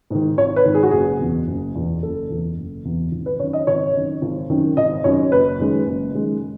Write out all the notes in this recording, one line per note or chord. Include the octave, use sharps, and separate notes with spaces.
G#2 D#3
G#1 C#5
B4
G#2 D#3
G#4
F#4
F#1 G#4
E2 B2
F#1
E2 B2
F#1 A4
E2 B2
F#1
E2 B2
G#1
B4
F#2 D#3 C#5
D#5
G#1 C#5
F#2 D#3
G#1
F#2 D#3
G#1 D#5
F#2 D#3 C#5
F#1 B4
F#2 D#3 G#3
F#1
F#2 D#3 G#3